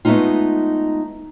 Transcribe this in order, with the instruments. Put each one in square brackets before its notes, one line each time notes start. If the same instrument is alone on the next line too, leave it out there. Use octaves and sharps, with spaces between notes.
[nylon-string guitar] G#3 A3 B3 C4 D#4 F4